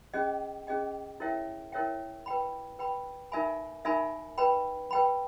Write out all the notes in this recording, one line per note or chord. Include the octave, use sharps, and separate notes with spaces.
C#4 G#4 D#5 G5
C#4 G#4 D#5 G5
E4 A#4 C#5 E5 G5
E4 A#4 C#5 E5 G5
B4 G5 B5
B4 G5 B5
D#4 A#4 E5 G#5 B5
D#4 A#4 E5 G#5 B5
B4 G5 B5
B4 G5 B5